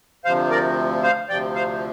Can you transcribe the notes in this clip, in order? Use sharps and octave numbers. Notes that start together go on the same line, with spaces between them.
D2 C3 F3 C5 F5
A#4 D5
C5 F5
D2 C3 F3 D5 G5
C5 F5